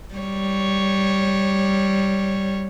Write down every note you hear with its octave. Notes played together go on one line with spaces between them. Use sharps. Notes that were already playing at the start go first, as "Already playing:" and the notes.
G3 C#5